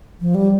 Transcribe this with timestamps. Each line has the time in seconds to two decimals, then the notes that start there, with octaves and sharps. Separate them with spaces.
0.21 F3
0.35 G3